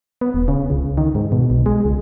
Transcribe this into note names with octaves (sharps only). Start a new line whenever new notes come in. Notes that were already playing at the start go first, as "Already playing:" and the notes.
B3
D#1
C#3
C#2
D#3
G#2
B2
B1
G#3
C#2